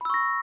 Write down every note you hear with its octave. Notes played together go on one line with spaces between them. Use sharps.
B5 C#6 E6 A#6